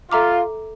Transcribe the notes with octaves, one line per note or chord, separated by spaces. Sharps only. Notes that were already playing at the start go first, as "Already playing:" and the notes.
F4 A4 E5 A#5 D6